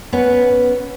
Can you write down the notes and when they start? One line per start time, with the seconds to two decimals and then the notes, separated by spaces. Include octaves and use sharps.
0.13 B3 C#4 B4